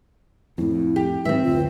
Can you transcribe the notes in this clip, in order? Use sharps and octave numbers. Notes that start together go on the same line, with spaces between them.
F2 A2 E4
G4
G#2 D#3 F#3 C4 B4 E5
F#1 D2 F4